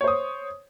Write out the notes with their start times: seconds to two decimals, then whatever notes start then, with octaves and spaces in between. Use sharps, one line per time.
0.01 C#5
0.04 C5
0.08 D#6